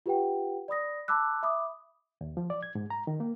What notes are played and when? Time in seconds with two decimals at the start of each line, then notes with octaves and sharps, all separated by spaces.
0.06 F4 G4 B4 F#5 G5
0.68 D5 B5 D#6 A#6
1.08 A5 B5 D6 E6 F#6
1.43 E5 B5 D6 D#6
2.21 D#2
2.37 F3
2.50 D5
2.63 G#6
2.75 G#2
2.90 A#5
3.07 D#3
3.20 A#3